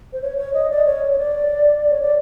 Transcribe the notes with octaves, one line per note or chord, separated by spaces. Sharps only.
C5
C#5
C#5
D#5
D5
C#5
C#5
D5
C#5
D5